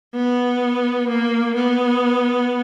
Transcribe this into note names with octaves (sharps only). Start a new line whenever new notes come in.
B3
A#3
B3